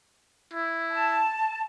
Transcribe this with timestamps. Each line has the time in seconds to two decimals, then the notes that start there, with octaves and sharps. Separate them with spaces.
0.53 E4
0.92 A5